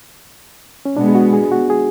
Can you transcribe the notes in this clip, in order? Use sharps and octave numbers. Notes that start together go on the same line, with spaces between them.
C#4
B2 G#3 B3 D4
G#4
F#4
G#4
F#4
G#4